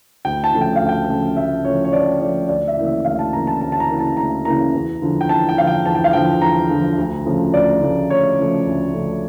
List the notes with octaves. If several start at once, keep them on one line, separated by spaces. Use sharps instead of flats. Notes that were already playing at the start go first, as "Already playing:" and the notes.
D2 G5
A5
C#3 F3 A3
G5
F5
D2
G5
C#3 F3 A3
D2 E5
C#3 F3 A3 C#5
C#5
D2 D5
C#3 F3 A3 D5
D2 D5
E5
C#3 E3 A#3
E5
D2 F5
A5
C#3 E3 A#3 A#5
A5
D2 A5
A5
A#5
C#3 E3 A#3
A5
D2 A#5
C#3 E3 A#3 A#5
E2
D3 F3
G5
E2 A5
G5
D3 F3 F5
G5
E2 A5
G5
F5
D3 F3 G5
E2 A#5
D3 F3
D2
C#3 F3 A3
D2 D5
C#3 F3 A3
D2 C#5
C#3 F3 A3
D2
C#3 F3 A3